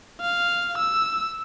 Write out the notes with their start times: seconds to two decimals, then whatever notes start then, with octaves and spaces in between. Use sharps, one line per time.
0.21 F5
0.77 E6